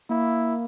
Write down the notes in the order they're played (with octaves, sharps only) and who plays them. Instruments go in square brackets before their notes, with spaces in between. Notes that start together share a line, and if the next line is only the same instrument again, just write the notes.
[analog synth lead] A#3 [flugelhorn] E4